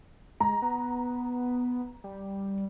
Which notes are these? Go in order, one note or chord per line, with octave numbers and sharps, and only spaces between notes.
G#3 A#5
B3
G3